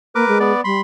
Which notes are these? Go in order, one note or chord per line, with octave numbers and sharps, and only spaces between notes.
A#3 A#4 B4 D6
G#3
B3 D5
G3 B5 C6